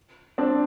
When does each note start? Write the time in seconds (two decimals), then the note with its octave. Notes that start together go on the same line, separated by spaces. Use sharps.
0.38 C4 D4